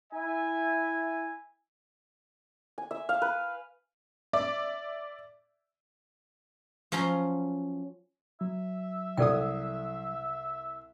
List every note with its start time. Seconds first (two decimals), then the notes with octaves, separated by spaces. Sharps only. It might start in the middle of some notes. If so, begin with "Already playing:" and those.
0.13 E4 E5 G#5
2.78 G#5
2.91 E5
3.09 F5
3.22 B4
4.33 D5 E5 D6
6.92 F3 F#3 C#4 F4 A#5 C6
8.41 F#3 E5
9.17 C2 A4 D5 G5 D#6